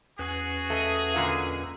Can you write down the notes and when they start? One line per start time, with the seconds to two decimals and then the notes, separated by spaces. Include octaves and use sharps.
0.19 E2 C#4 F#4 G#4 B4
0.70 A3 D#5
1.16 A#2 D3 G#3